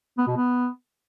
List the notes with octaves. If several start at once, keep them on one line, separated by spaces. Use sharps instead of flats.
B3
B2
B3